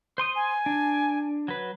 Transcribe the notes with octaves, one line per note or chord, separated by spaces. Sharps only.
C5 C6 D#6
G#5
D4
F#3 B4